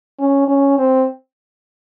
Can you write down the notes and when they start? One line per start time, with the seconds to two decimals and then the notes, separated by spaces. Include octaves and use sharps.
0.20 C#4
0.48 C#4
0.78 C4